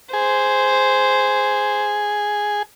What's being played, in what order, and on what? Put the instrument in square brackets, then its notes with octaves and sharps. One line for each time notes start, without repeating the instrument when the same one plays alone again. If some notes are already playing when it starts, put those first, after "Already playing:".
[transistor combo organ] G#4 [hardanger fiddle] C5